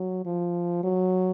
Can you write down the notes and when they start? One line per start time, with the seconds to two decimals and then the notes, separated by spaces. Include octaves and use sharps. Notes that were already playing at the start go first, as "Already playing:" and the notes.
Already playing: F#3
0.26 F3
0.84 F#3